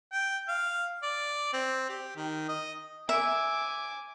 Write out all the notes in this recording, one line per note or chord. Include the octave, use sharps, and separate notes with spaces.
G5
F5
D5
C4
G4
D#3
D#5
E5 G#5 D6